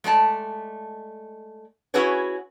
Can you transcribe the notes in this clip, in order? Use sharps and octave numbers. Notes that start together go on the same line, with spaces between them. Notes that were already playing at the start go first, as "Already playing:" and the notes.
G#3 A3 D5 A5
C#4 E4 F#4 G#4 B4 C#5